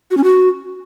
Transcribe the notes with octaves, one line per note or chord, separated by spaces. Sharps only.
F#4
C#4
F#4